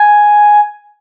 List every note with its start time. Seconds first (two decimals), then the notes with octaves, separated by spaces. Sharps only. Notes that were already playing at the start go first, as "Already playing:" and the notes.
Already playing: G#5